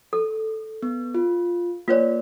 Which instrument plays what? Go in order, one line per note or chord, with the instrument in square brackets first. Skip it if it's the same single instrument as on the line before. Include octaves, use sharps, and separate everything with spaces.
[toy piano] A4
[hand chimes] B3
F4
[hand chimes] A#3 D5 [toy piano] F4 B4 C#5